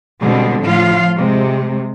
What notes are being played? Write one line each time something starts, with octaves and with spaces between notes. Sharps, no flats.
B2 D3 G3 G#3 C4
A2 F3 F4 F5
C3 G#3